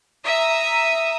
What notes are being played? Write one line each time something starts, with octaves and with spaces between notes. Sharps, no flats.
E5 A#5 D#6